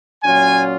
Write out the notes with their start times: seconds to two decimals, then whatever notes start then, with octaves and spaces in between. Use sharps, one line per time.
0.23 A#2 F#3 C#4 F4 G#5